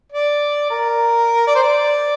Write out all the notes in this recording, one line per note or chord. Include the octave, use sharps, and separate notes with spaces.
D5
A#4
D5
C5
D5